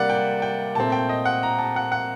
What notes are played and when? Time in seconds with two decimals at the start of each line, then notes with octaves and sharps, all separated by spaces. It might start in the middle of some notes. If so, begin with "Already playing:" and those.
Already playing: C3 G3 A#3 D5 F#5
0.10 G5
0.42 G5
0.75 A#2 A3 C4 A5
0.92 G5
1.09 D#5
1.25 F#5
1.43 A#5
1.58 A5
1.76 F#5
1.92 F#5